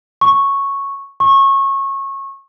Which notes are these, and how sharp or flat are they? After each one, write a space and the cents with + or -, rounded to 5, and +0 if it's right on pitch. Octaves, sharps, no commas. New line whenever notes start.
C#6 -5
C#6 -25